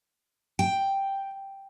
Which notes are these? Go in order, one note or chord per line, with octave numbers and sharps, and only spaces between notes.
G5